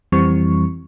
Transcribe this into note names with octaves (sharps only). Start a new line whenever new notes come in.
F2 E3 G3 C4 C#6